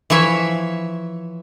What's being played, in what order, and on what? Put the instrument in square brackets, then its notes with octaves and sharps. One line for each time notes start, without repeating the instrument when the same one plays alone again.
[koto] E3 F3 C#5 E5